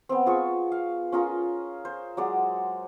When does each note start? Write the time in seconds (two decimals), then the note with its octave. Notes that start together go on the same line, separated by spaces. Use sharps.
0.09 B3 C4
0.26 F4 G#4 C#6
0.72 F5
1.12 C#4 F4 G#4 A#4
1.85 C5
2.17 F#3 G#3 D5 F#5